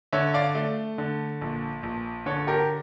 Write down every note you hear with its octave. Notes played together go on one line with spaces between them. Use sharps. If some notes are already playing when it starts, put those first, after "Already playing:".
D3 C#5 E5
D5 F5
A3
D3
A#1
A#1
D3 A4 C#5
G4 A#4